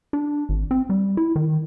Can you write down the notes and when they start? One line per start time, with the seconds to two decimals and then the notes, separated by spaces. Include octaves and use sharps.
0.13 D4
0.49 G#1
0.71 C4
0.89 G3
1.17 E4
1.36 D#3